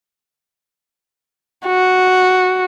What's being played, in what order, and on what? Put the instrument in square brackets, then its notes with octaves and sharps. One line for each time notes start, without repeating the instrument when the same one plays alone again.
[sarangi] F#4